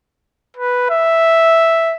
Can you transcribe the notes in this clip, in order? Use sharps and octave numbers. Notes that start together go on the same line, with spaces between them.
B4
E5